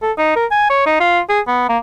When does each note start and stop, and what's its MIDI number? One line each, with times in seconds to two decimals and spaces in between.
0.02 0.12 69
0.18 0.35 63
0.36 0.46 70
0.51 0.67 80
0.70 0.86 73
0.86 0.99 63
1.00 1.20 65
1.29 1.40 68
1.47 1.68 59
1.69 1.78 58